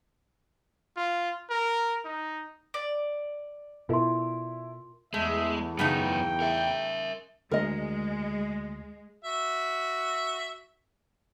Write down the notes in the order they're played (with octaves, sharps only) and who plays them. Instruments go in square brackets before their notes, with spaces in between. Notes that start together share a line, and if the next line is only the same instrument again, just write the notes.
[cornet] F4
A#4
D#4
[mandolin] D5
[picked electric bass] B2 [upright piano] E4 A4 [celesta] F4 A#4 C6
[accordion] E2 [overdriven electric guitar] G#3 [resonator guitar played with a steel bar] A3 [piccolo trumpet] E5
[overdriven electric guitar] F#2 B3 [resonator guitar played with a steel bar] C#3 A3 D#4 [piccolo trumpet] G5
[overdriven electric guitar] A#4 E5
[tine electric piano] D2 [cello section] G#3 [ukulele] A#4 D#5
[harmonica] F#4 E5